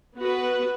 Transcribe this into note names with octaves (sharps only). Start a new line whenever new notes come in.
B3 F#4 B4